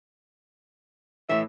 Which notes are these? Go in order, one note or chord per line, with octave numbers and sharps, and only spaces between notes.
A2 E3 E5